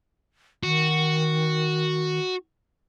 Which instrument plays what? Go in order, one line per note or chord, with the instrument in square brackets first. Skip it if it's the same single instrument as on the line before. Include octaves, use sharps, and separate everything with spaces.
[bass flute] D#3 [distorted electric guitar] F#4